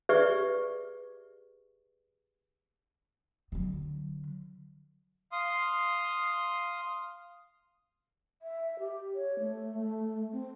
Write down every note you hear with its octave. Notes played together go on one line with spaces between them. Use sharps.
G4 G#4 B4 D5 E5 C#6
D3 F#3
F5 C6 D#6
E5
G4
C#5
A3
A3
C4